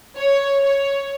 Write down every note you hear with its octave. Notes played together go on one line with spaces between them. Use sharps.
C#5
C#5